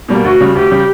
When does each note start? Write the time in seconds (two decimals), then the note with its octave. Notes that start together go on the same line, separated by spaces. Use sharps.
0.09 B2 G3 A#3
0.24 D2 F#4
0.41 C#3 G3
0.55 D2 G4
0.71 C#3 G3